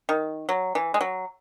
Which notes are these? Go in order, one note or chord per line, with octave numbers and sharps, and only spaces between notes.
D#3
F#3
E3
G#3
F#3